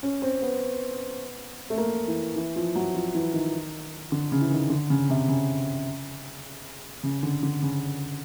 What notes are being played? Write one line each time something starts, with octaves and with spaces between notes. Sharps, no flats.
C#4
C4
B3
A3
A#3
E3
E3
F3
F#3
F3
E3
D#3
D3
C#3
E3
D#3
D3
C#3
C3
C#3
C#3
D3
D3
C#3